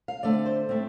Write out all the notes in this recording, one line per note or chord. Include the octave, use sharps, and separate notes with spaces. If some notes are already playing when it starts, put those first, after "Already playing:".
F5
D3 A3 C4 D5
C5
A2 A3 C4